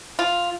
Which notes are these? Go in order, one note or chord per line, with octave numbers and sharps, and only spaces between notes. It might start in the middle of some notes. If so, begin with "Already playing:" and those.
F4